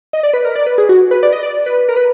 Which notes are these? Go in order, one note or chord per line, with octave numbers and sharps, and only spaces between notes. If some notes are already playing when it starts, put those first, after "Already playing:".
D#5
D5
B4
A#4
D5
B4
G#4
F#4
B4
D5
D#5
D5
B4
A#4
B4